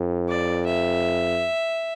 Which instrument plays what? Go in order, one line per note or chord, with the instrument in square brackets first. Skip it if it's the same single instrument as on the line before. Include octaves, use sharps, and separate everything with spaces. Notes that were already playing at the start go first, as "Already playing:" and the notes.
Already playing: [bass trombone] F2
[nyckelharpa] D5
E5